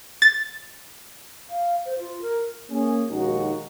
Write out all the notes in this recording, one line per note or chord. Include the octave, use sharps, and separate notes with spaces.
A6
F5
C5
F4
A#4
A#3 C#4 G#4
A#1 D#2 G#3 D#4 F#4